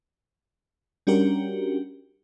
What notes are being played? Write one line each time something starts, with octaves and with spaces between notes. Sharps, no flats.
G3 C#4 D4 F#4 G4 A#4